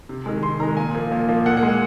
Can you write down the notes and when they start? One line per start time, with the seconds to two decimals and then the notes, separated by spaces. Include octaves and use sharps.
0.09 C3
0.26 D#3 G#3
0.43 C3 C6
0.60 D#3 G#3 A#5
0.77 A#2 G#5
0.94 F3 A#3
1.12 A#2
1.29 F3 A#3
1.46 A#2 F#5
1.57 F#5
1.63 G#3
1.68 F#5